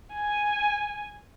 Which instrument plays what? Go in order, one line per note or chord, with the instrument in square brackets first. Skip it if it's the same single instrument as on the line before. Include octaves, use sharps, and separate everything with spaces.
[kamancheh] G#5